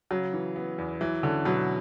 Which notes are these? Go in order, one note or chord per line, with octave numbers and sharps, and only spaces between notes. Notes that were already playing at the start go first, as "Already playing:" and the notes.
C#3 F#3
E3
B3
E2
E3 F#3
D3 C#4
B2 F#3